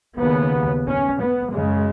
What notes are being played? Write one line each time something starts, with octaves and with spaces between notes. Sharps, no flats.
D#2 C#3 B3
C#4
B3
F#2 C#3 G#3